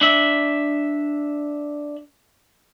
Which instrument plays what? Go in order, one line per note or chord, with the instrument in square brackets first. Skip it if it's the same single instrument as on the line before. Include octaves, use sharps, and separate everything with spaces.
[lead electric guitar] D4 E5